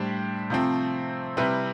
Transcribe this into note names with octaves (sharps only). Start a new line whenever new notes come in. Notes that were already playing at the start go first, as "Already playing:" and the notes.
Already playing: A2 G3 D4 G4 C5
C3 F3 A3 C4
C3 G3 C4 E4 B4